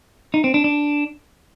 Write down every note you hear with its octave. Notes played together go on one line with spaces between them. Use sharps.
D#4
C4
D4
D4